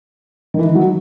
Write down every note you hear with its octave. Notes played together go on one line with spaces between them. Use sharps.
D#3
E3
F#3